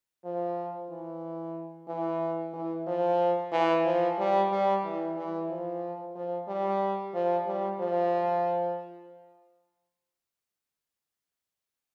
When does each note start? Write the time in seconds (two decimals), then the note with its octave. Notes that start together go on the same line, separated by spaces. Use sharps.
0.25 F3
0.90 E3
1.88 E3
2.54 E3
2.87 F3
3.52 E3
3.86 F3
4.19 G3
4.52 G3
4.84 E3
5.17 E3
5.50 F3
6.15 F3
6.48 G3
7.14 F3
7.47 G3
7.80 F3